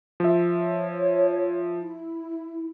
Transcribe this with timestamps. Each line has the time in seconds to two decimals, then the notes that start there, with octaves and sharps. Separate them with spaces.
0.20 F3 E5
0.61 C#5
1.77 E4